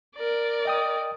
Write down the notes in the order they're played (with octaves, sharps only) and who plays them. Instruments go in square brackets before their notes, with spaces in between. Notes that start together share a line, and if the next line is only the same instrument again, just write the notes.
[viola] A#4 D5
[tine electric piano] D#5 G5 D#6